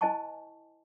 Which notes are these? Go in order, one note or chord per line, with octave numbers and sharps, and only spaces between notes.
E4 C5 D#5 G#5 A5 C#6